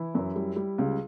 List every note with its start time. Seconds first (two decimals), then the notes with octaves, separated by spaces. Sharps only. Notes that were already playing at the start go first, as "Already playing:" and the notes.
Already playing: E3 E4
0.15 F#2
0.36 G3
0.56 G3
0.78 C#2